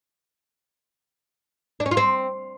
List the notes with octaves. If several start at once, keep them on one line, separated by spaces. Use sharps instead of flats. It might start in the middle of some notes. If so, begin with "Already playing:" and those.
D4
C#4
F4
C4